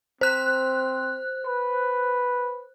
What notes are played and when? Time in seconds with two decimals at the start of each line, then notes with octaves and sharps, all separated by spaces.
0.21 C4 C5 F#6
1.45 B4